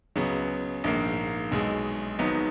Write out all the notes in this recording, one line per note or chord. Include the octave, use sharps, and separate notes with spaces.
C#2 C#3 F#3 B3
A#1 G#2 D#3 A#3
B1 B2 G#3
G#1 G#2 F#3 B3 D#4